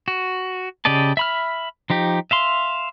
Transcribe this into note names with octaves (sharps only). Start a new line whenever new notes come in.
F#4
C#3 G4 D5 D#5 A5
E5 B5 F6
F3 D#4 G4
E5 F5 C6